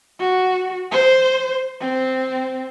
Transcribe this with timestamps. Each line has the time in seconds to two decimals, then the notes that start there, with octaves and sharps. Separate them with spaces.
0.20 F#4
0.91 C5
1.81 C4